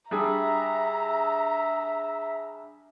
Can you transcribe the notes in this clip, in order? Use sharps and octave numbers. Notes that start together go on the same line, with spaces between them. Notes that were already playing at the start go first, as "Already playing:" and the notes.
G3 D4 G#4 E5 A#5